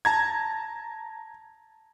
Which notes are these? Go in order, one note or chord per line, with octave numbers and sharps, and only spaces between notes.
A5 A#5 G#6